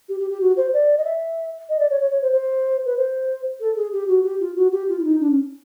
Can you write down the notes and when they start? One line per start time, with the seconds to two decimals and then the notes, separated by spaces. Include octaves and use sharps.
0.09 G4
0.20 G4
0.30 G4
0.41 F#4
0.57 C5
0.73 D5
0.98 D#5
1.04 E5
1.69 D#5
1.79 D5
1.90 C#5
2.01 C#5
2.11 C#5
2.22 C5
2.32 C5
2.86 B4
2.97 C5
3.60 A4
3.76 G#4
3.92 G4
4.08 F#4
4.24 G4
4.40 F4
4.56 F#4
4.72 G4
4.89 F4
4.99 E4
5.04 D#4
5.20 D4
5.31 C#4